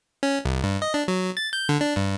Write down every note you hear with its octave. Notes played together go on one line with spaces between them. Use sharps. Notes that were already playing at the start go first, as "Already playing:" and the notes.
C#4
C2
G2
D#5
D4
F#3
A6
G6
D3
D4
G2